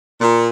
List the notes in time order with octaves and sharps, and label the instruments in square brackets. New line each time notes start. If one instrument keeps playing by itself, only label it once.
[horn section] A#2